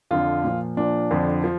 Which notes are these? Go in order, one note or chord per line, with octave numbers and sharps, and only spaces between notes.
F2 D3 F3 F4
A#2 F3
A#2 F3 D4
F2 D3 F3
F3